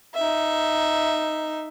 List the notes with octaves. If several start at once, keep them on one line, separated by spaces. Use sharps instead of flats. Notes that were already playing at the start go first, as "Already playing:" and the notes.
D#4 E5